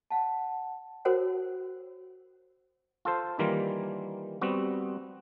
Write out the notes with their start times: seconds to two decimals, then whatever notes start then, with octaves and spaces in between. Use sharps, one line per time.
0.11 F#5 A5
1.05 F#4 A#4 C5 C#5 F#5
3.05 F4 A4 C5
3.39 D#3 E3 G3 A#3 F4
4.41 G3 B3 C4 F#4